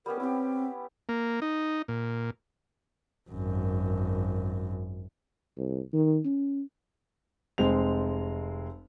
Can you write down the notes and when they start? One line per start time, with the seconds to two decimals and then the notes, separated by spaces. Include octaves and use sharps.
0.06 G3 B3 C#4 A#4
0.20 C4 E4 G4
1.09 A#3
1.42 D#4
1.88 A#2
3.31 G#1 F#2
5.58 C2
5.93 D#3
6.25 C#4
7.58 F1 G#3 C4 F7